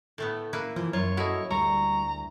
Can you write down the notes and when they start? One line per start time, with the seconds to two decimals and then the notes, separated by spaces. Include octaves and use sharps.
0.18 A2 A3 B3
0.53 A#3 E4 B4
0.76 E3 F3
0.93 F#2 F4 A#4 C#5
1.17 E4 F#4 A4 D#5
1.51 D2 G3 A#5 C#6